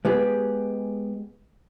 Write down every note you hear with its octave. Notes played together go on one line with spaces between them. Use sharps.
G#3 B3 G4 G#4